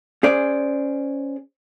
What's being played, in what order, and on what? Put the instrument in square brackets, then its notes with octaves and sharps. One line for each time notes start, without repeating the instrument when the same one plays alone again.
[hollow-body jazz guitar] C#4 G#4 C5 D5